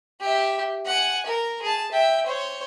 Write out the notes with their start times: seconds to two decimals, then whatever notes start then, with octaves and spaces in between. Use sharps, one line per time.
0.21 G4 E5
0.86 F#5 G#5
1.26 A#4
1.62 G#4 A5
1.92 E5 G5
2.26 C5 C#5